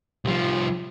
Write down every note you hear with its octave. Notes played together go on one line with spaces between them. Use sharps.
C2 F3